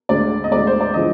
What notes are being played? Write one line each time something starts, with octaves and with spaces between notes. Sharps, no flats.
D2 D3 G#3 D5
D#5
D2 D3 G#3 D5
C5
D5
D3 F3 G#3 D#5